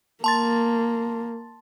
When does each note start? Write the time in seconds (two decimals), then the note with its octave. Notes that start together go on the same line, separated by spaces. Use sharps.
0.24 A#3 A5 C6 A6